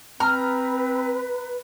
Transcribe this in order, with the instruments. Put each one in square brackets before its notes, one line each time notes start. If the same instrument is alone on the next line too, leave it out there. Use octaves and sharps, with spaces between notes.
[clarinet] C4 [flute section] B4 [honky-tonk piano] A#5 [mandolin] F6